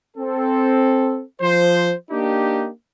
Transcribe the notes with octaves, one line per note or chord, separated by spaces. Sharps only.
C4 A4
F3 C5
A#3 D4 D#4 G4